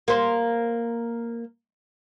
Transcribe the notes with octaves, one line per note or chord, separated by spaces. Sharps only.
A#3 C5